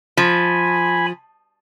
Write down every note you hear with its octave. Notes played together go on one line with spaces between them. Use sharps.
F3 G#5 B5